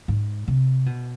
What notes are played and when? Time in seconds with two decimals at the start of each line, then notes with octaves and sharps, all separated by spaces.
0.08 G#2
0.48 C3
0.86 B2